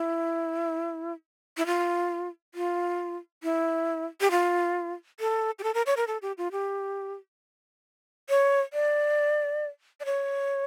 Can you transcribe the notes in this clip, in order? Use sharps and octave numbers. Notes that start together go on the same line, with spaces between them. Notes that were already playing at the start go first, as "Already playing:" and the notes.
Already playing: E4
E4
F4
F4
E4
G4
F4
A4
G4
A4
A#4
C#5
A#4
A4
G4
F4
G4
C#5
D5
D5
C#5